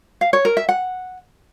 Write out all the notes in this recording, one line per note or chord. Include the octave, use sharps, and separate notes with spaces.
F5
C#5
A#4
E5
F#5